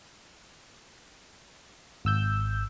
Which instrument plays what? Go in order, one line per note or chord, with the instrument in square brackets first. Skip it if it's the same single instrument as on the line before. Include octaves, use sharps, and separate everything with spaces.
[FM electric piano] G#1 E6 G6